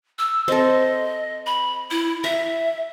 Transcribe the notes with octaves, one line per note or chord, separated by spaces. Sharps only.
E6
C4 A4 D#5
B5
E4
E5 A#5